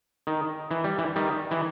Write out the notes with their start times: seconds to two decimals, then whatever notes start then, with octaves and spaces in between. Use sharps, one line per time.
0.27 D#3
0.71 E3
0.84 G3
0.98 E3
1.16 D#3 G3
1.51 E3